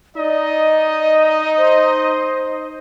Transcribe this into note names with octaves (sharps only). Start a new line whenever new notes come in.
D#4 D5 D#5
C5